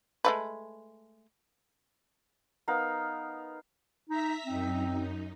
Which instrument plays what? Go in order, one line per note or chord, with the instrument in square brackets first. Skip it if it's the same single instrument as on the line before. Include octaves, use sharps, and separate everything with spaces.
[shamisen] G#3 A3 B4
[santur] B3 D#4 A#4 F5
[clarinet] D#4 [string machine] E5 A#5 B6
[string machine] F#2 D#4 [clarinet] C4